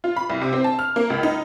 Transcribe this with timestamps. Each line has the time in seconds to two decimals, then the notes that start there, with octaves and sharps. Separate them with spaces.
0.04 F4
0.16 B5
0.30 C2
0.41 C3
0.53 C4
0.64 A5
0.79 F6
0.96 A#3
1.10 C#2
1.23 D#4